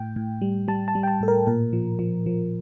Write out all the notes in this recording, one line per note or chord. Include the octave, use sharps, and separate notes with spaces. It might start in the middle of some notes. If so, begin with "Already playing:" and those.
Already playing: A2 G5
A2
G3
G3 A5
A5
G3
G5
A5
A2 A4
A#4
A#2 A#4
F3
F3
F3